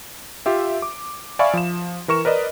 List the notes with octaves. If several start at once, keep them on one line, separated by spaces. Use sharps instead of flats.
F4 G4 E5
D6
D5 E5 F5 G#5 B5 C#6
F3 E7
E3 A#4 C#6 E7
A#4 B4 D5 D#5